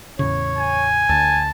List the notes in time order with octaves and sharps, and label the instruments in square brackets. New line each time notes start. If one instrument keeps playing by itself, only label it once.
[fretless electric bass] E2 A2 C#3 [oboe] C#5
[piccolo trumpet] G#5
[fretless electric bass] D2 [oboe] A5